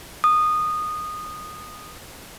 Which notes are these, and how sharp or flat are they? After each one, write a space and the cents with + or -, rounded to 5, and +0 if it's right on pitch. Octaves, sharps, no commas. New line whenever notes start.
D#6 -15